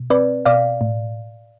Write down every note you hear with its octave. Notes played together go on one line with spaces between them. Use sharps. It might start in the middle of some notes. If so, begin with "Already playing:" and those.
Already playing: B2
C4 B4 D5
B2 D5 F5
A2